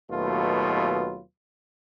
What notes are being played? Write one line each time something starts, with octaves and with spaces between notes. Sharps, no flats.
D#2 B2 F#3 A3 F4 B4